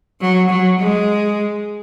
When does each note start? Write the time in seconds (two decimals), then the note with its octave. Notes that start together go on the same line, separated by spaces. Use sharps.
0.21 F#3
0.50 F#3
0.79 G#3